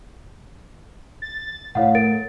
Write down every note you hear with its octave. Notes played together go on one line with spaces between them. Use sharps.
A6
A2 C#5 F5 F#5
A#4 A6 D7